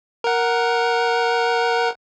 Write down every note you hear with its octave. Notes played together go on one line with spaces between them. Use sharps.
A#4 F#5